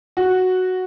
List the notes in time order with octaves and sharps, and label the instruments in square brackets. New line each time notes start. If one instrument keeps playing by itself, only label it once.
[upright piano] F#4